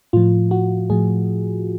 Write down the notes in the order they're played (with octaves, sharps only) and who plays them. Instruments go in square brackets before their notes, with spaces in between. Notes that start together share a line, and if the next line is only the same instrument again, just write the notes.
[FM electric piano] A2 F3 F4
F#4
A2 F3 G#4